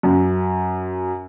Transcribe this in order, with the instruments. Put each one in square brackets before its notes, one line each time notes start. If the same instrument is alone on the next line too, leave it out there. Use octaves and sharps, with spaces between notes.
[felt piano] F#2